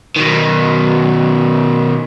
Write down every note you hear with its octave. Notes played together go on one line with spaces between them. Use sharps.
B2 D#3